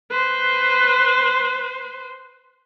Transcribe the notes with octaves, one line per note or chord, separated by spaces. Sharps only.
B4 C5